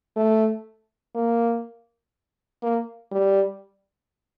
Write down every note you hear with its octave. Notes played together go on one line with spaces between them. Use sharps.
A3
A#3
A#3
G3